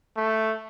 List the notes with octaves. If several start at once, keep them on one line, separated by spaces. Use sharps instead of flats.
A3